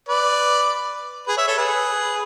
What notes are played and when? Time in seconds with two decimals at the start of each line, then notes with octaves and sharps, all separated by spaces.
0.09 B4 D5
1.27 G#4 B4
1.37 C#5 E5
1.47 A4 C#5
1.58 G#4 B4